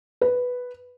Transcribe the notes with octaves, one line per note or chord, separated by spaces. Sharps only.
B4